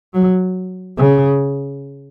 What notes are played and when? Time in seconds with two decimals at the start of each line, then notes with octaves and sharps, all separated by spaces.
0.14 F#3
0.98 C#3